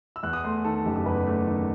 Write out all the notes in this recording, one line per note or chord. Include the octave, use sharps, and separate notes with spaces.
E6
E2 F#6
D#6
A3 C6
D#3 A4
A4
F#1 G4
G4
E2 B4
A3
D#3